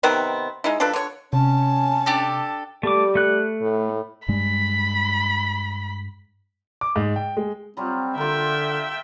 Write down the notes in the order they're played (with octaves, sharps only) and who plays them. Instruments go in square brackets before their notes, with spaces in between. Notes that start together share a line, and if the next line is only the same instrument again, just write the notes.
[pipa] C3 D#3 B3 C4
G#3 D#4 E4
F3 D4 A4 B4
D3 C#5
[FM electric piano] C3 [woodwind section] C#4 [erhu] A5
[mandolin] D4 G4 A4
[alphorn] G3 [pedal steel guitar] A3 D6
[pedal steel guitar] A3 F#6
[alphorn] A2
[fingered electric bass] G2 G3 G#3 [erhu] B5
[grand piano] D6
G#2
G5
G#3
[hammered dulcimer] F#3 G3 F4 [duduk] C4
[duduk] D3 [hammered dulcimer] A#3 F4 [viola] E5 G5